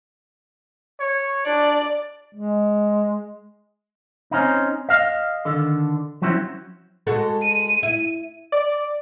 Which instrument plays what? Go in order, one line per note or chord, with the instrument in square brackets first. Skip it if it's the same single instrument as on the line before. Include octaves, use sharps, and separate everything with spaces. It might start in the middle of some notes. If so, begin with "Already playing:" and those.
[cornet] C#5
[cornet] D4 [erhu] D5
[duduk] G#3
[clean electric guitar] C4 C#4 D#4
D#5 F5
D3 D#3 A4
F3 F#3 C4 C#4 E4
[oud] G#3 F#4 A4
[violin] D#7
[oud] E4
[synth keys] D5